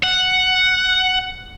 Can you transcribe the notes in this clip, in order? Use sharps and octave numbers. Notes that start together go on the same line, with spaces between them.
F#5